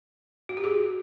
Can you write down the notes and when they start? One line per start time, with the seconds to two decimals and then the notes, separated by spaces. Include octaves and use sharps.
0.49 F#4
0.57 G4
0.64 F#4 G#4